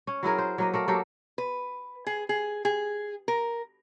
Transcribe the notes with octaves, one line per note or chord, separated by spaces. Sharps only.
C#4
F#3 E4 G#4 A#4
C5
F#3 A#3 D#5
A3 A#3 A#4
F#3 A#3 G4 A4
B4
G#4
G#4
G#4
A#4